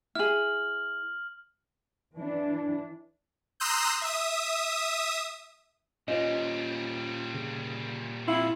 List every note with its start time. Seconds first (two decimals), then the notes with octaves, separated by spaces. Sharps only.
0.15 E4 G#4 F6 F#7
2.16 E3 D4
3.60 A#5 C6 D#6 E6 F#6 G6
4.02 E5 D#6
6.08 A#2 G3 C#4 F4 C5 D#5
7.34 C#3
8.27 C4 E4 F4 F5 C6 C#7